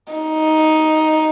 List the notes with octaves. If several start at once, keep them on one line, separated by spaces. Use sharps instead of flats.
D#4